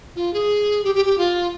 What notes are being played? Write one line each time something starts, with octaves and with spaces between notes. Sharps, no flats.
F4
G#4
G4
G4
G4
F4